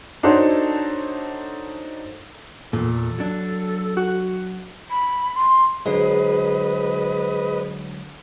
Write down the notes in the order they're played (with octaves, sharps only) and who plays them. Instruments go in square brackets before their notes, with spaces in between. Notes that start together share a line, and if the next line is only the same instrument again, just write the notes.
[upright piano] D4 D#4 F#4 A4 C5 C#5
[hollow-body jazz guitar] E2 A#2 [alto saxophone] A4
[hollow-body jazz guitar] F#3 D4
[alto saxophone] F#4
[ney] B5
C6
[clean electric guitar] D3 F#3 G#3 [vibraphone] G#4 C5 [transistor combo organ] B4 D#5